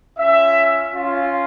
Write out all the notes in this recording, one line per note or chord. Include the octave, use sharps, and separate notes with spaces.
C#4 F4 E5
C#4 F4